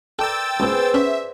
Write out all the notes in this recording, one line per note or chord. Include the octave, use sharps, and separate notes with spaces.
A4 A#4 D5 G5 C6 E6 A6
C#2 A#2 B3 G#4 C5 G#5
C#4 E5 F#5 A#5